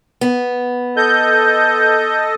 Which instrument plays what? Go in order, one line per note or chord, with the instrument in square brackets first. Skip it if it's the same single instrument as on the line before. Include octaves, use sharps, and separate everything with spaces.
[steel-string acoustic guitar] B3
[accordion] A4 D#5 [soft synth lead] G6